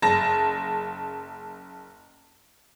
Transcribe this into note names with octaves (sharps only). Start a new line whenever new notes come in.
F#1 A5 A#6